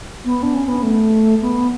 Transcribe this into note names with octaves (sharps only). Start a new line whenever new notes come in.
B3
D4
C#4
B3
A3
B3